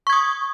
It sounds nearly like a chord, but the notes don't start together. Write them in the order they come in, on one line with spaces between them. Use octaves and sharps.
C#6 G#6 D#6